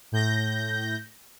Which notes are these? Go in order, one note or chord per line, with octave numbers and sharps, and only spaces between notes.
A2 G6 A#6